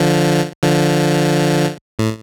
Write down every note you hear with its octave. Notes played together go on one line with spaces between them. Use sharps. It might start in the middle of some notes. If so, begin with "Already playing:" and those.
Already playing: D3 F3
D3 F3
A2